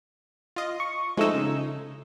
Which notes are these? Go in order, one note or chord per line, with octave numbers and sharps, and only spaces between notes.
F4 D#5
C#6
F3 G#3 A3 D#4 E6
C#3